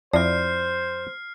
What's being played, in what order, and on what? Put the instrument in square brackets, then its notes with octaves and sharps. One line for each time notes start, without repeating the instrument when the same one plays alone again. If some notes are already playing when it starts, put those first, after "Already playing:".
[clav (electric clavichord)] F2 E4 [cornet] C5 [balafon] D5 [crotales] F6 C7